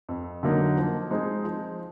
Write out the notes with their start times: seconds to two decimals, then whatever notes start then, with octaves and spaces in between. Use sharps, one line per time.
0.09 F2
0.43 D3 F#3 A#3 D#4
0.77 F3
1.11 G#3 C4 D#4
1.44 F3